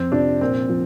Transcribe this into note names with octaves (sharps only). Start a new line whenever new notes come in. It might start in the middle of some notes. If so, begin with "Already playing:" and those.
Already playing: F2 C4
C3 F3 D4
A#2 C4
F3